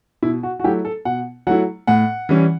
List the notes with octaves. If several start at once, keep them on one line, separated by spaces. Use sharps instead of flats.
B2 E4
F#4
F#4
F#3 A3 E4 G4
A4
B2 F#5
F#3 A3 E4 F#5
A2 F#5
E3 G3 C#4